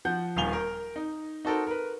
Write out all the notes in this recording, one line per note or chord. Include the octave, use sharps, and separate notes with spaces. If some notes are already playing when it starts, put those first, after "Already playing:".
F3 F#5 G6
D#1 D#2 F5 G#5 F7 G7
A#4
D#4
D#4 F#4 A4 A#4 C5
A#4 B4